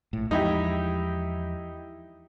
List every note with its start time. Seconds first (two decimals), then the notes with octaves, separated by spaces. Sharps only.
0.13 A#1 A2
0.31 E2 F3 G#3 D#4 E4 G4